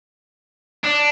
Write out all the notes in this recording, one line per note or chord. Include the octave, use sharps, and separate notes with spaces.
D4